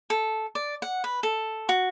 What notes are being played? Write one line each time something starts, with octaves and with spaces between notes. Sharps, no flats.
A4
D5
F#5
B4
A4
F#4